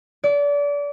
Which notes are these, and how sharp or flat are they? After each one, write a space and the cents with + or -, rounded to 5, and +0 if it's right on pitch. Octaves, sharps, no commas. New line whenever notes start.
D5 -30